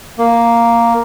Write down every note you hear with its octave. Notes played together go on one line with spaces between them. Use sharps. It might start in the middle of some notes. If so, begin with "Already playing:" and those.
A#3